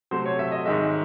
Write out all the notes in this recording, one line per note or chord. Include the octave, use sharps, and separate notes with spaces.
C3 F#3 A3 C5
C#5
E5
D#5
G#2 D#3 G#3 E5